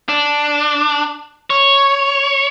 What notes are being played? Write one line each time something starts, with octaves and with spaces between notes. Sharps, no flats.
D4
C#5